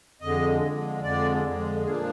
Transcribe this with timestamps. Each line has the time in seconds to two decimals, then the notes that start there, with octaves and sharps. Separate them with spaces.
0.21 F2 D3 G#3 D#5
0.62 F2 D3 G#3
1.02 F2 D3 G#3 D5
1.43 F2 D3 G#3
1.84 A#2 F3 A#3 D4 G#4